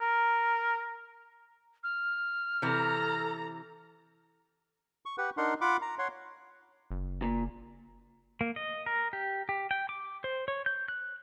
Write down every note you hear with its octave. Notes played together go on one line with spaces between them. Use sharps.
A#4
F6
C3 E3 A4 A#5
C#6
G4 B4 F#5
D4 D#4 A#4 F#5 C6
F4 F#5 B5 D6
A#5
C#5 F#5 C6
F#1
A#2
A#3
D#5
A#4
G4
G4
G5
D6
C5
C#5
G6
F#6